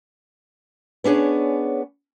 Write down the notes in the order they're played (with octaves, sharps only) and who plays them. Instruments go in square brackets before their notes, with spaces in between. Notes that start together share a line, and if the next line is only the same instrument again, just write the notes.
[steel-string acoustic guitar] B3 C#4 D4 G#4 C#5